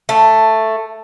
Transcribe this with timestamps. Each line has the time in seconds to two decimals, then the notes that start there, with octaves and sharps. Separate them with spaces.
0.09 A3